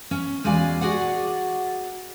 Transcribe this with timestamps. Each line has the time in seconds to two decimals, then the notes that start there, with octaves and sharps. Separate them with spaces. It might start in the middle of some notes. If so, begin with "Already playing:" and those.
0.11 C#4
0.44 E2 G#3 F#4 D5 F5 G#5
0.81 F#4 G#4 D5 F#5